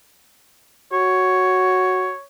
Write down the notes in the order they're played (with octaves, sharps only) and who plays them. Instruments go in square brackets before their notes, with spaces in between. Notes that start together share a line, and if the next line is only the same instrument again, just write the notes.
[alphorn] F#4 [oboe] C#5